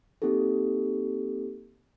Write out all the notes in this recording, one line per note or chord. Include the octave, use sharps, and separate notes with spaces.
A#3 C4 D#4 G4 A4